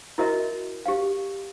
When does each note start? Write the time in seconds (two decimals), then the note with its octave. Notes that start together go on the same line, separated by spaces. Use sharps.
0.18 E4 F#4 A#4 D#5 E5
0.86 G4 F5